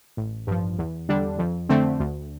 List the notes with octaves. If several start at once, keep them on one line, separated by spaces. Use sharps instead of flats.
A1
G2 F3
E2
D3 G3 D4
F2
D3 A3 C4
D2